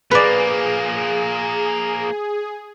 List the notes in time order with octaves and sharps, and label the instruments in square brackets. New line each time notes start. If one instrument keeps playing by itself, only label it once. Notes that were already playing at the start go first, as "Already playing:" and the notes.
[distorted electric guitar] F3 A#3 [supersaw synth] G#4 [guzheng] B4 D5